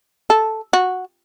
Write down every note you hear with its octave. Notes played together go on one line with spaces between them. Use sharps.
A4
F#4